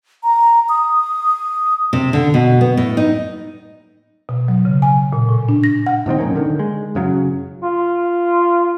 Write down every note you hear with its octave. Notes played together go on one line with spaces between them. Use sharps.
A#5
D#6
C3
D3
B2
B3
A2
D#4
B2
F#3
C#3
G#5
A#2
A2
D4
A#6
F#5
G#2 C3 D#3 C4
D1 B1 A#3 C#4
D3 D#3
G#3
F#1 C#3 F#3
F4